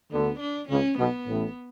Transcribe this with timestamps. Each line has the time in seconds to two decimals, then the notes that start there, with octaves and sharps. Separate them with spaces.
0.11 D2 D3 B3
0.40 D4
0.69 C#2 C#3 C#4
0.98 B1 B2 B3
1.27 A1 A2